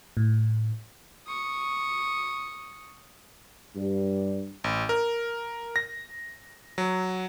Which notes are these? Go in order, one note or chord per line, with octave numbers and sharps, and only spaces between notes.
A2
C#6 D#6
G2
A1
A#4
A#6
F#3